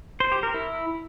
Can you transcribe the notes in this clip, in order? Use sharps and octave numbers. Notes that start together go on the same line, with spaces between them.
C5
G4
A#4
E4